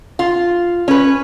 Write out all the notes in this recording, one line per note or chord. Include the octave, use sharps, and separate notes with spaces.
F4
C#4 B4